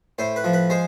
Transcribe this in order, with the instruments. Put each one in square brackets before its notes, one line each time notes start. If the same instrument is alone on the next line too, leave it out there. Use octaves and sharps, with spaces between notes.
[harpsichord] A2 C5
B4
F3
B4
G#3 C5